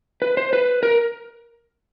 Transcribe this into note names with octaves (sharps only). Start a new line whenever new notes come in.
B4
C5
B4
A#4